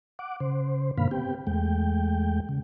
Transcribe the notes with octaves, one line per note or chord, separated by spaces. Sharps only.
F#5 D6
C#3 C5
G2 B2 D3 A#3 F5 B5
B3 C4 G4 G5
E2 G#3 A3 G5
C#3